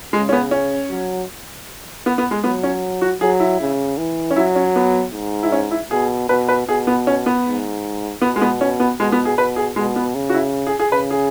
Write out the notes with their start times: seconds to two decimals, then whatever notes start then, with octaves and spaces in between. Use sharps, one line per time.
0.13 C#3 G#3
0.29 C#4
0.33 B3
0.51 C#4
0.90 F#3
2.06 B3
2.18 B3
2.31 G#3
2.44 F#3 B3
2.63 C#4
3.02 F#4
3.21 F#3 G#4
3.40 E4
3.60 C#3
3.98 E3
4.31 C#4
4.36 F#3 E4
4.56 C#4
4.76 B3
5.14 G#2
5.43 E4
5.52 C#4
5.71 E4
5.91 B2 G#4
6.29 B2 B4
6.49 B4
6.67 B2 G#4
6.87 B3
7.07 C#4
7.26 B3
7.46 G#2
8.22 B2 B3
8.36 G#3
8.41 B3
8.61 C#4
8.80 B3
9.00 B2 G#3
9.12 B3
9.25 G#4
9.37 B2 B4
9.56 G#4
9.76 B2 G#3
9.96 B3
10.15 C#3
10.30 F#4
10.34 E4
10.67 G#4
10.79 G#4
10.91 C#3 B4
11.11 G#4